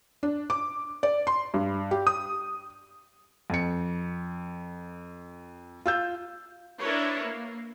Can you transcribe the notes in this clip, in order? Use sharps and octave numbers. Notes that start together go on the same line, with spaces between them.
D4
D6
D5
C6
G2
G4
D#6
F2 C#7
F4 E6 G6
D4 E4 A#4 B4 C#5
A#3